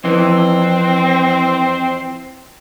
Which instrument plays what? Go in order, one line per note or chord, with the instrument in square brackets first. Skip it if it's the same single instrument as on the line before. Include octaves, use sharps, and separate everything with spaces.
[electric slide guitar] F2 E3 [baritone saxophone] C4